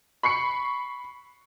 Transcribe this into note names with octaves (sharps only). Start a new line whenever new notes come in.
B5 C#6 C7 C#7